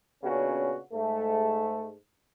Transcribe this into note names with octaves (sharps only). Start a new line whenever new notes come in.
A#2 C#3 B3 C#4 D4 F#4
G#2 A3